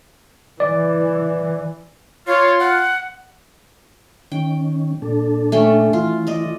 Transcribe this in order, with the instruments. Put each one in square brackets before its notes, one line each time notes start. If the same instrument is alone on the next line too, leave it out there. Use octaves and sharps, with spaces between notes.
[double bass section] E3 [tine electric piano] D5
[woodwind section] F4 [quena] C#5
[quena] F#5
[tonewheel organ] D#3 C#4 [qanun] G5
[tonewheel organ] A#2 D4 A4
[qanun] A3 C#4 G5
[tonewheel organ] E3 E4 [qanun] F4
[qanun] D5 D#5